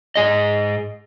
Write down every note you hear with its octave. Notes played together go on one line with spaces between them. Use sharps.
G#2 G#4 D#5